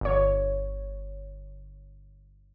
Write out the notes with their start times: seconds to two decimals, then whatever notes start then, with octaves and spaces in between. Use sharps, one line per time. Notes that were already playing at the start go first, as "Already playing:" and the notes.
0.01 G1 C#5